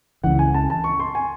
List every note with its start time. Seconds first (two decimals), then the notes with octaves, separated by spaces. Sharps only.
0.24 C#2 C#3 E3 F#5
0.39 G#5
0.54 A5
0.70 A5
0.84 C#6
0.99 C6
1.15 G#5